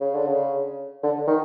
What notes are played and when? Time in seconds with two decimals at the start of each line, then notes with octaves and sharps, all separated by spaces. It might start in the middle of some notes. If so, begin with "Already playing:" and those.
0.01 C#3
0.14 D3
0.27 C#3
1.03 D3
1.27 D#3